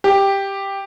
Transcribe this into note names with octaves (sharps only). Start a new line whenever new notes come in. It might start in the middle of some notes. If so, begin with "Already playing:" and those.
G4